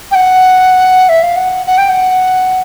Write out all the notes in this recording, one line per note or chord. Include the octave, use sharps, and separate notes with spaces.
G5
F#5
E5
F5
F#5
F#5
G5
F#5